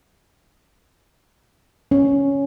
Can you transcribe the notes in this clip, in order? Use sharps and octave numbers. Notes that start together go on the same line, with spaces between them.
C#4